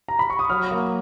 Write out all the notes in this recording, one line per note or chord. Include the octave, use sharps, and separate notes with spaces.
A#5
B5
C#6
D#6
F#3 F6
A#3